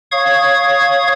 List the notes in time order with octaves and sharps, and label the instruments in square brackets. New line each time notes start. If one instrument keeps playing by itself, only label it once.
[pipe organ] C#5 F5 C#6 D#6 G#6